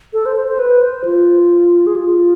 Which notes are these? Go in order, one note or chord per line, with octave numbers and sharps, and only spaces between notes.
A4
C5
C5
C5
B4
C5
F4
G#4
F4